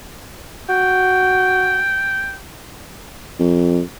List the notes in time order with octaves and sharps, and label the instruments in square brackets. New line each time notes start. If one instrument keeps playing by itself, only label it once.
[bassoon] F#4 [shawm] G5
[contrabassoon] F2